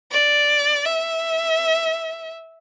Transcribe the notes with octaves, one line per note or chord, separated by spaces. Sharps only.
D5
E5